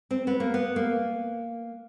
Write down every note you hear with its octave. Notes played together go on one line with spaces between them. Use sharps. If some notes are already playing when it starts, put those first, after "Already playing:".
C4
B3
A#3
B3
A#3